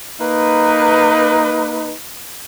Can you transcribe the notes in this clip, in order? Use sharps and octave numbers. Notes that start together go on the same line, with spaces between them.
A#3 D#4 B4